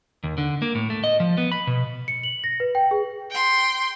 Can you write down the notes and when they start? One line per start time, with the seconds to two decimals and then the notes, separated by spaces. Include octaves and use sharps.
0.23 D#2
0.38 D3
0.62 A#3
0.75 A2
0.90 A3
1.04 D#5
1.20 F3
1.38 B3
1.52 B5
1.67 B2
2.08 C#7
2.23 F#7
2.44 A#6
2.60 B4
2.75 G5
2.91 G#4
3.32 G5 C6